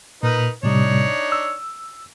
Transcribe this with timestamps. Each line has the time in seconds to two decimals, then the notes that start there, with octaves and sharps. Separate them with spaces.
0.23 A#2 D#4 A#4 B4
0.63 A2 C3 G3 D4 D#4 C#5
1.32 E6